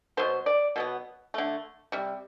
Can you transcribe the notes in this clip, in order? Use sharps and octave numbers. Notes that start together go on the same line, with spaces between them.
B2 F#3 B3 C5
D5
B2 F#3 B3
D3 A3
C3 G3